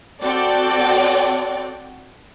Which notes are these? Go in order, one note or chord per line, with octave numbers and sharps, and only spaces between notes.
C4 F#4 A4 D5 G5